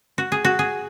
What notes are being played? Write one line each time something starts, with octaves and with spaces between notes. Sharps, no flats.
F#4
G#4
F#4
G#4